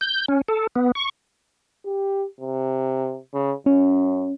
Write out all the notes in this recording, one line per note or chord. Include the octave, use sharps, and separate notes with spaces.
G6
C#4
A4
B3
C#6
G4
C3
C#3
F#2 C#4